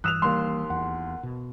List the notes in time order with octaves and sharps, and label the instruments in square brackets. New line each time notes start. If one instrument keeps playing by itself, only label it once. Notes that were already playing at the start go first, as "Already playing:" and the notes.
[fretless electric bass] G2 [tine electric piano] E3 D#6 E6 [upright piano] F#6 E7 F7
[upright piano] D#2 C6 [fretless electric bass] G3 A#3
[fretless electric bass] E2 [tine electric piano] F#5
[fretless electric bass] B2